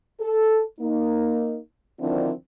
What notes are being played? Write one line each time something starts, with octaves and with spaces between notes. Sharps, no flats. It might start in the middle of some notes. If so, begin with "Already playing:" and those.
A4
A#3 D#4
D3 D#3 F3 C4 D4 E4